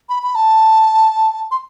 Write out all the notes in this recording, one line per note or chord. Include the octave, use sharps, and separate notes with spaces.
B5
B5
A5
C6